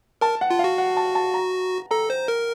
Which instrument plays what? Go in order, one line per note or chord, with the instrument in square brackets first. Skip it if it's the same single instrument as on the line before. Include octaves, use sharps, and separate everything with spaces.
[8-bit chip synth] A#4 [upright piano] A5
[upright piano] F#5
[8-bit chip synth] F4
[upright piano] F5
[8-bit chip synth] F#4
[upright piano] F#5
A5
A5
A#5
[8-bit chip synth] A4 [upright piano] A#5
[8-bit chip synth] C5
A#4